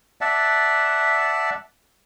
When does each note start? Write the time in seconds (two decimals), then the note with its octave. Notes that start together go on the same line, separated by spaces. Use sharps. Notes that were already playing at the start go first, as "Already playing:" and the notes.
0.21 D5 E5 F#5 A5